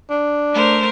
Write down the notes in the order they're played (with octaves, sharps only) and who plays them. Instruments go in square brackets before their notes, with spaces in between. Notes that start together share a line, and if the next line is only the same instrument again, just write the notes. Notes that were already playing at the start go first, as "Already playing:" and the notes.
[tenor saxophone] D4
[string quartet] A3 A#4 C5